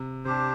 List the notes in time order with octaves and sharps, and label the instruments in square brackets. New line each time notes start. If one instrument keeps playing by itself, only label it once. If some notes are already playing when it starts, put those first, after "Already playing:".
Already playing: [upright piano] C3
[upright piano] C3 [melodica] D4 G4 C5